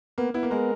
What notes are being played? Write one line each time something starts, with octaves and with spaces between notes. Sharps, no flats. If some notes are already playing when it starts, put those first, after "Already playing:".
A#3 B3
B3 E4
A#3
G#3 A#4